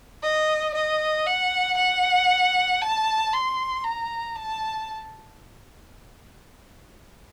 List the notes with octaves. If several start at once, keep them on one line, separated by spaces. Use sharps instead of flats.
D#5
D#5
F#5
F#5
A5
C6
A#5
A5